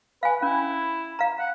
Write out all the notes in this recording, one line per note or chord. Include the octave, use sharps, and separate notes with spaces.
B4 F5 G#5
C#4 E4
F5 A#5
F#5